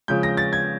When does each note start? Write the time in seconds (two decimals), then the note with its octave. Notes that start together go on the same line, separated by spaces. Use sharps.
0.08 C#3 F3 G#3 G6
0.23 A#6
0.37 A6
0.53 G#6